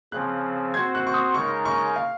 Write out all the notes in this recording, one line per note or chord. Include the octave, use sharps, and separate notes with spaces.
C#3 F3 C4 F#6
C4 F#4 C5 G#6
F#6
C#6
D#6
C#3 G#3 D#4 A#4 C#6
C#6
F5